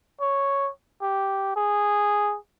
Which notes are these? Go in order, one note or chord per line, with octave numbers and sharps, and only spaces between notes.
C#5
G4
G#4